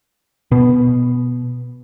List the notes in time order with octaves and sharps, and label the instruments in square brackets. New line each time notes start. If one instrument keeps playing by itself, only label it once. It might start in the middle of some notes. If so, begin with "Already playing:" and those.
[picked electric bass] B2 B3